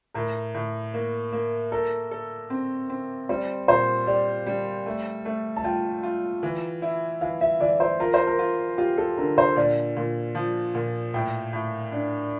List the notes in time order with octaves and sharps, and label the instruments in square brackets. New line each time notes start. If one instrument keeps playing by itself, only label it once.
[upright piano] A2 [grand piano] A#4
[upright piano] A2
A#3
A#3
[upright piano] A4 [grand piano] A#4
[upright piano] A4
C4
C4
[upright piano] G3 [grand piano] C5
[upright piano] A#2 [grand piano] C5
[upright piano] G4 [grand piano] D5
[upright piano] G3
A3
A3
[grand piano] A5
[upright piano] F4 [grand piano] G5
[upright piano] F4
E3
E4
[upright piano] E3 [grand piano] F5
[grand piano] E5
[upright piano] E3 [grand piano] D5
[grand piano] C5
[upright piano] F4 [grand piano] A#4
[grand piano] C5
A#4
[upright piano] F4
[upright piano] F4 [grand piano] G4
[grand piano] A4
[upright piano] D3 [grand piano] A#4
[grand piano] C5
[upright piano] A#2 [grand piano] D5
[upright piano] A#2
F3
A#2
[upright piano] A2 [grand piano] G5
[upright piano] A2
D4